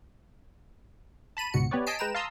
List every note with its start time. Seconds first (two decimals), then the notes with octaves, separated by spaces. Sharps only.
1.37 A5 B5 D#7
1.54 C#2 G#2 B2 F#4 C#7
1.71 B3 G4 B4 C#5 D5
1.87 D#5 G#5 A5 B6 C7 D7
1.99 G#3 B4 G5 A#5 E7
2.15 F5 A5 A#5 C6 D#6 E6